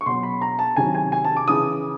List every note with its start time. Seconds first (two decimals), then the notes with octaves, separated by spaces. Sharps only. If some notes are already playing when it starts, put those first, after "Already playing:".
0.01 C#6
0.06 B2 F#3 C6
0.23 B5
0.41 A#5
0.59 A5
0.76 C3 D#3 F#3 G#5
0.95 G#5
1.12 G#5
1.25 A5
1.37 D6
1.48 C#3 E3 D#6